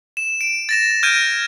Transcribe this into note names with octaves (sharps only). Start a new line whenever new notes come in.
E7
D7
A6 A#6 E7
F6 G6 G#6 D7 D#7